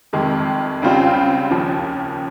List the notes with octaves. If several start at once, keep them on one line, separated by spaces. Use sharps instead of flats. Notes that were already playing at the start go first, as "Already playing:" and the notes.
F2 C3 D#3 G#3
C#2 C#3 G3 C4 F4
D#2 C#3 F3